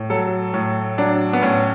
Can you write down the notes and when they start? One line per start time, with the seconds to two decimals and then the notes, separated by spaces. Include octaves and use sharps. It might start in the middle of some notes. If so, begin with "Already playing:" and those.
Already playing: A2
0.10 F#3 A4
0.54 A2
0.98 F#3 D4
1.33 B3
1.42 A2 C#4